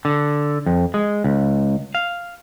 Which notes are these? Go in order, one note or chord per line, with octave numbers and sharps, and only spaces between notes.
D3
F2
G#3
C#2
F5